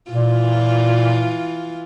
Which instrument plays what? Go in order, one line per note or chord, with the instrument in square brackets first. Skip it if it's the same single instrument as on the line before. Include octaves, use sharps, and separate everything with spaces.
[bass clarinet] A#2 [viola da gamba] E3 F4